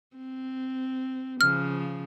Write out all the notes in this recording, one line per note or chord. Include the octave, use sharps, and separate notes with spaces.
C4
C#3 F3 F6